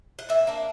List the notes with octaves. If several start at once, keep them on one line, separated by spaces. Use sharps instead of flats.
F#5
A#2 E5
A#3 D4